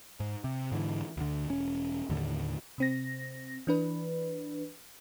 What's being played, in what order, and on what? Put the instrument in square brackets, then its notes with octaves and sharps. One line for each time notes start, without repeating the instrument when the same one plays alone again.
[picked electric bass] G#2
C3
G#2 D3 E3
D2 D3
E1 C#4
D#2 A2 D3
[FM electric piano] C3 C4 A#6
E3 D4 B4